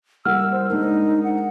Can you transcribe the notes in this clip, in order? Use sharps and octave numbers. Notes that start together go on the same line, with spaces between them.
G3 E4 A#4 F#5 E6 F6
C5
G#3 D4 D#4 A#4
F#5